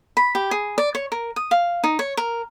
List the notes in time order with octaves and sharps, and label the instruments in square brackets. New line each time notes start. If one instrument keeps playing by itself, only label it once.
[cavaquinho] B5
G4
G#4
D5
C#5
A#4
D#6
F5
D#4
C#5
A#4